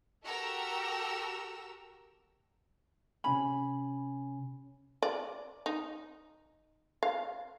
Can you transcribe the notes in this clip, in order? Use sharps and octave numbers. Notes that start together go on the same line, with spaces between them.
F#4 G4 A4 A#4 A#5 E6
C3 C#4 G#5 B5
D5
D#4
F5